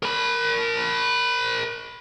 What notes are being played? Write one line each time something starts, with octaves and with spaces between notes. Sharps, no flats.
A#4 B5